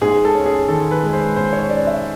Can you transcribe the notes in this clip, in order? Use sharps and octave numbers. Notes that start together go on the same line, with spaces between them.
G#2 G#4
A4
C#4
G#4
D#3 A4
B4
G#3
C5
G#2 C5
C#5
C#4 D5
E5